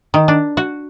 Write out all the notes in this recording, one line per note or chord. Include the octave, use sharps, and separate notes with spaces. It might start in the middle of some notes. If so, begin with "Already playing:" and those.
D#3
D4
F#4